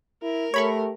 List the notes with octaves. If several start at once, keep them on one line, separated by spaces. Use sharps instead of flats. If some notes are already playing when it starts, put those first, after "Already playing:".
E4 A#4
A3 G4 C#5 B5 C#6